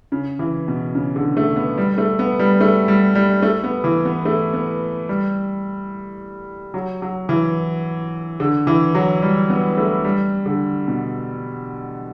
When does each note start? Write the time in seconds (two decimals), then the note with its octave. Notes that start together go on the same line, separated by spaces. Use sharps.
0.12 C#3
0.39 E3
0.68 B2
0.95 C#3
1.16 D3
1.37 A3
1.56 B3
1.78 G3
1.98 A3
2.19 B3
2.39 G3
2.60 A3
2.88 G3
3.15 G3
3.42 A3
3.64 B3
3.84 E3
4.05 B3
4.25 A3
4.53 B3
5.09 G3
6.74 F#3
7.02 F#3
7.29 E3
8.40 D3
8.67 E3
8.95 F#3
9.22 G3
9.50 B3
9.77 A3
10.05 G3
10.46 D3
10.88 B2